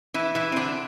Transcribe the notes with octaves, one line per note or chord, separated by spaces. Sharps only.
E3 E4
E3 E4
C4
D3 D4